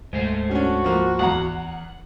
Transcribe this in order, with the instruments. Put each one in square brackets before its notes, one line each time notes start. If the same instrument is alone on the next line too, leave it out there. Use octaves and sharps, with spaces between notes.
[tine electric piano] D2 G#2 [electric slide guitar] G#3 A3 C5
[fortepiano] C#4 D4 [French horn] F#4
[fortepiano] F3 A#3
[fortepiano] E2 F5 A#5 [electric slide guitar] F#5